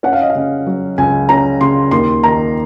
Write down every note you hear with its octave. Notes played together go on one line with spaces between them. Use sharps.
C#4 F#5
F5
D#5
F5
C#3
F#3
C#2 G#5
C#4 A#5
C#3 C6
D#2 C6
D#3 A#5